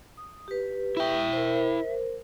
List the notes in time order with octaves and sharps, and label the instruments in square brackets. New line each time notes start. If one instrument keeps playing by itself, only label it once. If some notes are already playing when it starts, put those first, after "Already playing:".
[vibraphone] D#6
G4 B4
[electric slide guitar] E4 G5 [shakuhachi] E5
[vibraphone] A#4 C5